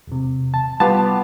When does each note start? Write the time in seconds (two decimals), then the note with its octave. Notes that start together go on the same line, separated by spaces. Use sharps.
0.07 E1 C3
0.54 A5
0.80 G3 B3 F4 G4 A5